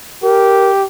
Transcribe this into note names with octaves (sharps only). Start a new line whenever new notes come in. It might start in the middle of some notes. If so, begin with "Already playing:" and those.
G4 A#4